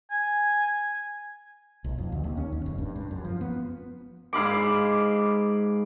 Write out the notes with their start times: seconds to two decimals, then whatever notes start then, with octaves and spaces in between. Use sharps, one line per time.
0.11 G#5
1.84 B1
1.98 F2
2.12 D2
2.24 D#2
2.37 C#4
2.52 D#2
2.66 F1
2.78 G2
2.96 G2
3.11 F#2
3.25 F3
3.41 B3
4.33 G#2 F5 B5 D6